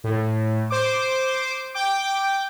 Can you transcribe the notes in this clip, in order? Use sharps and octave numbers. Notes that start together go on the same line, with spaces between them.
A2
C5 D6
G5 D6